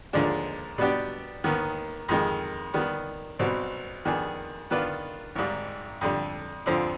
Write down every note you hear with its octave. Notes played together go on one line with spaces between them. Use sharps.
D#2 D3 F3 G#3 D4
B2 G3 B3 D4 G4
D#2 D#3 B3
F2 D#3 G#3
D#3 G3 B3
B1 B2 G3 C4
F2 D#3 B3 D4 G#4
D#3 B3 D4 F4 B4
G#1 G#2 G3
F2 D3 G3
F2 D3 F3 C4